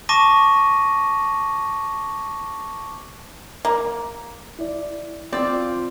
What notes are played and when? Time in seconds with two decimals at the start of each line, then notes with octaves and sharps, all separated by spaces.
0.09 A5 C#6 D6 A#6 D#7
3.65 A#3
4.59 E4 D5
5.33 C4 F4 D5 F5 G5